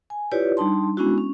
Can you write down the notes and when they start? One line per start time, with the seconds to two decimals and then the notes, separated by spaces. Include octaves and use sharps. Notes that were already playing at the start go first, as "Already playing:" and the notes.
0.10 G#5
0.31 E4 F4 G4 B4 C#5 D5
0.57 G3 D4 D#4 A5 C6
0.97 G#3 B3 C#4 D4 E4 F#4
1.18 C#4